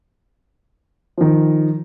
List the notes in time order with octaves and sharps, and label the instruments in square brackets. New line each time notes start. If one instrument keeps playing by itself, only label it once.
[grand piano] D#3 F3